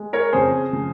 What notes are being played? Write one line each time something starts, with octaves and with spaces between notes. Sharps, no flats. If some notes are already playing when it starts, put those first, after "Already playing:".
Already playing: G#3
A#4 C#5
F2 C#3 F3 G#4 C5
C#3 F3